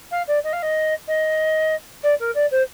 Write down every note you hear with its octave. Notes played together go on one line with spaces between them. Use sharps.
F5
D5
D#5
F5
D#5
D#5
D5
A#4
D5
C5